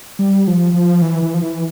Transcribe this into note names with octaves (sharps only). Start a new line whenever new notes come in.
G3
F3
F3
E3
E3
F3
E3